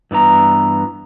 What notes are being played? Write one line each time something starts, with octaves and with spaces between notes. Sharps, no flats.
G2 E3 B3 A#5